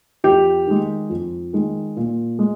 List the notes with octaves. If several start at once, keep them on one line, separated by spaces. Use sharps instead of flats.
F2 G4
D#3 G#3
F2
D#3 G#3
A#2
G#3